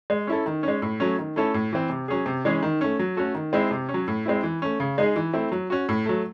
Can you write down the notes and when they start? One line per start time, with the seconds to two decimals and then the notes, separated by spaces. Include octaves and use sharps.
0.10 G#3
0.27 C#4 E4 A4
0.46 D#3
0.63 G#3 C#4
0.82 A2
1.00 F#3 A3 C#4
1.18 D#3
1.36 A3 C#4 E4 A4
1.54 A2
1.73 E3 C4
1.90 C3
2.08 F#3 C#4 G#4
2.26 C3
2.45 E3 G#3 C#4 G#4
2.62 D#3
2.81 A3 C#4
2.99 F#3
3.16 A3 C#4 F#4 A4
3.35 D#3
3.53 G#3 C4 E4
3.71 C3
3.89 C#4
3.94 F#3
4.08 A2
4.26 G#3 C4 E4
4.43 E3
4.62 A3 C#4
4.80 C#3
4.98 G#3 D#4 G#4
5.16 E3
5.33 A3 C4 E4
5.52 F#3
5.70 C#4 F#4
5.89 A2
6.06 F#3 A3